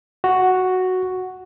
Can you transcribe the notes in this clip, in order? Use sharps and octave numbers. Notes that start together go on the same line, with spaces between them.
F#4